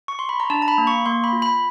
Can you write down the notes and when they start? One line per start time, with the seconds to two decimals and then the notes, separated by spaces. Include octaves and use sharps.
0.08 C#6
0.19 C6
0.29 B5
0.40 A#5
0.50 D4 A5
0.62 A#5
0.68 B5
0.78 A#3
0.87 C#6
1.06 A#3 C6
1.24 B5
1.33 F4
1.42 B5